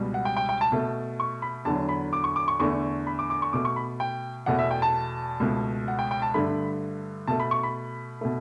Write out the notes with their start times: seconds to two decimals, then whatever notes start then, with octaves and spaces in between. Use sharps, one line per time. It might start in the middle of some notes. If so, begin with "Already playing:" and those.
Already playing: C#2 B2 G3
0.14 F#5
0.25 G5
0.37 G5
0.49 G5
0.61 A5
0.72 B2 A3
1.20 C#6
1.42 B5
1.65 E2 D3 F#3 A5
1.89 B5
2.13 D6
2.24 C#6
2.36 D6
2.48 C#6
2.60 E2 D3 A3 C#6
3.07 B5
3.19 D6
3.30 D6
3.42 C#6
3.53 B2 A3 D6
3.65 C#6
3.76 B5
4.00 G5
4.46 E2 B2 A3 F#5
4.59 E5
4.71 G5
4.82 A5
5.40 C#2 B2 A3
5.88 F#5
5.99 G5
6.11 G5
6.22 A5
6.34 G2 D3 A3 B5
7.28 B2 A3 A5
7.40 B5
7.51 C#6
7.63 B5
8.21 B2 A3